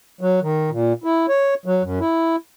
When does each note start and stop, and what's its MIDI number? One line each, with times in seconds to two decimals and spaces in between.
0.21 0.40 54
0.42 0.70 51
0.70 0.93 46
1.04 1.26 64
1.29 1.54 73
1.66 1.82 54
1.83 1.99 42
2.00 2.36 64